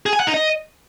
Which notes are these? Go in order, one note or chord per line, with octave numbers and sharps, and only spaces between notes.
G#4
G#5
F#5
D#4
D#5